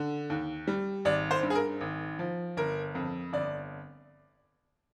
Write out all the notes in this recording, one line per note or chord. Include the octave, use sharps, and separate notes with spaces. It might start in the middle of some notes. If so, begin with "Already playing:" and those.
Already playing: D3
D#2
G3
G#1 D5
C5
G2
G#4
A#4
G#1
F3
G1 A#4
F2
G1 D5